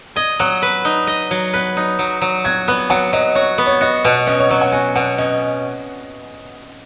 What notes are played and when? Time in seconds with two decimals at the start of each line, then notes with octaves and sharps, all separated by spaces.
0.16 D#5 G#6
0.39 F#3 F#6
0.62 B4
0.85 D#4
1.07 D#5
1.31 F#3
1.53 B4 F#6
1.77 D#4
1.99 F#3
2.22 F#3
2.45 F#4 G#6
2.68 B3 F#6
2.90 F#3 F#5
3.13 F#3 D#5
3.35 F#4 C#5
3.58 B3
3.66 C#5
3.81 F#4 D#5
4.04 B2 F#5
4.27 C#4 D#5
4.39 C#5
4.50 F#3 C#5
4.61 F#5
4.72 F#4 G#5
4.95 B2 F#5
5.18 C#4 D#5